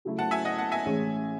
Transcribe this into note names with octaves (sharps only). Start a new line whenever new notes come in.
C#3 F#3 A3 E4
F#5 A5
E5 G#5
D#5 F#5
F#5 A5
E5 G#5
A1 A2 G#3 C#4 G#4